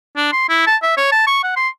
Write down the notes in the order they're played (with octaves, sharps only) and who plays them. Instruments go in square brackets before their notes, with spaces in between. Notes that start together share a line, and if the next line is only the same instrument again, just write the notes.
[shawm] D4
C6
E4
A5
E5
C#5
A5
C#6
F#5
C6